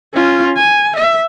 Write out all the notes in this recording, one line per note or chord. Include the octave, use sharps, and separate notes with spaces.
C#4 F4
G#5
E5